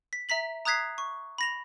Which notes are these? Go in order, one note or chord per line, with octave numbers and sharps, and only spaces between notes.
B6
E5 A#5 B6 F#7
A#5 D#6 F#6 G#6 B6 C7
C#6
B5 A#6 F7